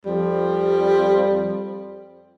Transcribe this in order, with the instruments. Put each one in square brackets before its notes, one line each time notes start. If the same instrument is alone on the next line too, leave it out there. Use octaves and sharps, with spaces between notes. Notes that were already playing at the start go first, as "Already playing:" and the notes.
[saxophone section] F2 F3 G3